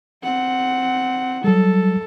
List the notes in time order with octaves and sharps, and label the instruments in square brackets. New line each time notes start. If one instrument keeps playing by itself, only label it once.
[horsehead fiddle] C4 F#5
[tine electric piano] F#3 G3 [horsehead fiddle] A4